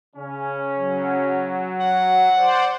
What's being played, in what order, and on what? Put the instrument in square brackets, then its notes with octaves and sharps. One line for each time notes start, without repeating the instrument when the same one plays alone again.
[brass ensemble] C#3 C#4
[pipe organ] F#3
[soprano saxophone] F#5
[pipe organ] C5 D5